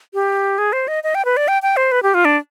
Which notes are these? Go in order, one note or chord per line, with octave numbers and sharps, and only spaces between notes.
G4
G#4
C5
D#5
D#5
G5
B4
D5
G5
G5
C5
B4
G4
F4
D4